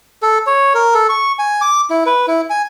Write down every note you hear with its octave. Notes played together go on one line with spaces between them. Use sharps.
A4
C#5
A#4
A4
C#6
G#5
D6
E4
B4
E4
G#5